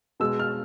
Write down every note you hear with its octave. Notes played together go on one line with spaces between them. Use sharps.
B2 G#3 E6
F6